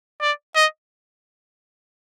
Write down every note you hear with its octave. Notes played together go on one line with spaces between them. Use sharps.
D5
D#5